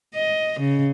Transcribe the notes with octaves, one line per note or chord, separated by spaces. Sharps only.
D#5
C#3